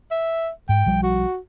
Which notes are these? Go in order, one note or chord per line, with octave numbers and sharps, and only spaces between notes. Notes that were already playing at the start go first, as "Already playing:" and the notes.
E5
G#2 G5
B1 F3 G3
F#4